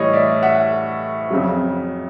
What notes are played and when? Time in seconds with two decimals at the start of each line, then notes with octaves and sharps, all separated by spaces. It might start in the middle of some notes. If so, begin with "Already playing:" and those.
Already playing: A2 E3 G3 C#5 D#5
0.13 D5 E5
0.42 E5 F#5
1.30 F2 C#3 F#3